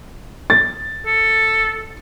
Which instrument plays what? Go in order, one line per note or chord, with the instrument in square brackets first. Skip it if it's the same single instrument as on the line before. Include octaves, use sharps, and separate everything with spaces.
[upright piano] A6
[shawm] A4